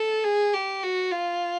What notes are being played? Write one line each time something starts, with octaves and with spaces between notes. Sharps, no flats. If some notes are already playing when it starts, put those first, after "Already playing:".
Already playing: A4
G#4
G4
F#4
F4